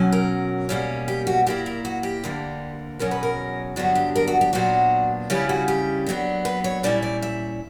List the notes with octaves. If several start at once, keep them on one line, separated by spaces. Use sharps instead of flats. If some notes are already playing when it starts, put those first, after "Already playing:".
Already playing: B2 F#3 C#4
A#4
B2 G3 A#3 C#4
G4
F#4
A#2 A#3 E4 G4
A#4
F#4
G4
D2 D3 A#3
E2 B2 F#3 C#4 A#4
B4
A#4
G2 D3 F#3 B3 D4 F#4
G4
A#4
F#4
G4
A#2 F#3 B3 D4 F#4
C#3 G3 C#4 E4 G4
F#4
G4
A#2 F#3 B3 D4
B4
C#5
A#2 G3 C#4 E4 D5
D5
E5